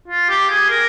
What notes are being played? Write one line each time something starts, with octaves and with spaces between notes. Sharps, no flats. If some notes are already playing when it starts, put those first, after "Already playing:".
F4
G4
G#4
A#4